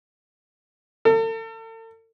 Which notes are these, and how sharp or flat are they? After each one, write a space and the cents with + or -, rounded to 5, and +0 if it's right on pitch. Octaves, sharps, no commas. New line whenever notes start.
A4 +40